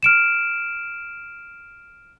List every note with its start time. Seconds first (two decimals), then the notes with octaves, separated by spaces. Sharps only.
0.03 F6 D7 E7